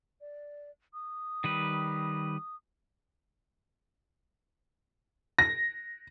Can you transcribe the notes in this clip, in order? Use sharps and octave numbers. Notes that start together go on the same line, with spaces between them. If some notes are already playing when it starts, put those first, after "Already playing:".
D5
D#6
D#3 G3 B4
A#6